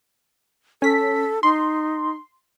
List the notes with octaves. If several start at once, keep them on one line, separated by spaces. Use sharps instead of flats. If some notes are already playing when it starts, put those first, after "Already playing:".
C#4 A4 B6
D#4 C6